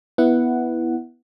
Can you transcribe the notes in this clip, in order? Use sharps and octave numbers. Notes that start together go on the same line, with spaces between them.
B3 E4 F#5